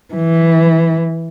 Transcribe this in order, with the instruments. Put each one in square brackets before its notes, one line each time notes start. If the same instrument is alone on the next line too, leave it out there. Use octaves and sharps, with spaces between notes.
[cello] E3